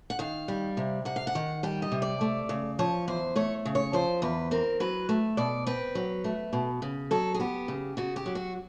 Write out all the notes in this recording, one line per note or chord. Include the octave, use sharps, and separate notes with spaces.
F#5
D#3 F5
G3
C3
C3 F#5
F5
F#5
D#3
G3 G5
D#5
C3
D5
A3
C#3
F3 C#5
E2 C5
A3 C#5
C#3
C#5
F3 C5
E2 B4
C4 A#4
F#3 B4
A3
B2 D5
C4 B4
F#3
A3
B2
C#3
F#3 A4
G#4
B3 G4
C#3
C#3 F#4
G4
F#3
F#4